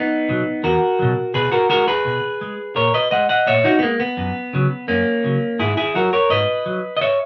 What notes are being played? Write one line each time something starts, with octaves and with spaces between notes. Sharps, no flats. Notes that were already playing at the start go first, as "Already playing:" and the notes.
Already playing: B3 D#4
B2 F#3
E2 F#4 A#4
B2 F#3
B2 G#4 B4
F#4 A#4
G#3 F#4 A#4
G#4 B4
B2
G#3
A#2 A#4 C#5
B4 D#5
G#3 D#5 F#5
D#5 F#5
A#2 C#5 E5
D#4 F#4
B3
G#3 A#3
B3
F#2
C#3 F#3
F#2 A#3 C#4
C#3 F#3
G#2 E4 G#4
E4 G#4
F#3 F#4 A#4
A#4 C#5
G#2 B4 D#5
F#3
D#5
C#5 E5